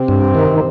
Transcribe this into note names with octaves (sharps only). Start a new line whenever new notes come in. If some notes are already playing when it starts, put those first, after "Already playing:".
Already playing: C3 C4
G2
D#3